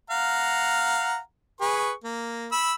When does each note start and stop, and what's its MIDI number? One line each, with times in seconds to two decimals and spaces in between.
0.10 1.18 77
0.10 1.18 78
0.10 1.18 82
1.61 1.92 68
1.61 1.92 71
1.61 1.92 85
2.04 2.49 58
2.52 2.74 83
2.52 2.74 88